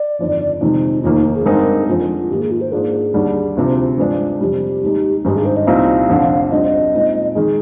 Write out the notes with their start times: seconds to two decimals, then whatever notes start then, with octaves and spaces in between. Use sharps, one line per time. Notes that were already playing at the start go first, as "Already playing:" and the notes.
Already playing: D5
0.19 G1 F2 D#3
0.61 F2 C3 D#3 G#3 D#4
1.03 F1 D#2 D#3 A#3 F4
1.15 D#4
1.35 G#4
1.46 G2 D3 G#3 C4 D#4 A#4
1.88 F2 D3 G#3 F4
2.30 G#2 D#3 A#3 G4
2.41 G#4
2.51 F4
2.61 C5
2.72 G#2 F3 A#3 D4 F4 G#4
3.14 D#2 D3 G3 D4
3.57 D2 C3 F3
3.98 G2 F3 G#3 D4
4.41 F2 C3 G3 G4
4.83 D#2 D#3 G#3 D#4
5.25 G#1 G2 D#3 G#3 D#4 G4
5.36 G#4
5.45 C5
5.57 D#5
5.67 C2 A#2 G3 C4 D#4 F5
6.09 F1 F2 D3
6.51 D2 D3 G3 C4 F4 D#5
6.94 A#2 G#3 C4 D#4
7.35 D#3 G#3 G#4